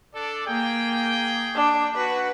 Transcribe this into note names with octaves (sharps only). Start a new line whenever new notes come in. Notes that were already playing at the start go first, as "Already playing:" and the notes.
D4 A4 D5
A#3 G#4 G5
D4
F#4 B4